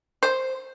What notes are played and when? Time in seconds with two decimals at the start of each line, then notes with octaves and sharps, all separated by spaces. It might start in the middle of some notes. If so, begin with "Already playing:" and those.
0.23 C5